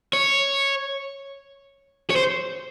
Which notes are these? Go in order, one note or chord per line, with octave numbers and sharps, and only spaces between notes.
C#5
C#5
C5